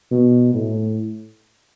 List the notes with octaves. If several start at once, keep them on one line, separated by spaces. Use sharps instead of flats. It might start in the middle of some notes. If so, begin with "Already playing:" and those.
B2
A2